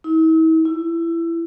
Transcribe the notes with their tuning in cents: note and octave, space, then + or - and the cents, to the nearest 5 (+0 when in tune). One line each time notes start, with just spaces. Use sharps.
E4 -45
E4 +20